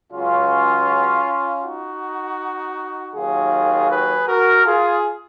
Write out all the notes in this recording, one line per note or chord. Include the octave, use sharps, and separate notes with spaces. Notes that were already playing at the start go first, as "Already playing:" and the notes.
C#2 C#3 F#3 C#4 F4
D#4 F#4
D#2 D#3 F#3 F4 G#4
G#4 B4
F#4 A#4
F4 G#4